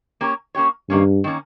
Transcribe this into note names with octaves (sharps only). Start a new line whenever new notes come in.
A#3 C#4 G4 C#5
A#3 C#4 G4 C#5
G2 D#3 A#3 C#4
D#3 A#3 C#4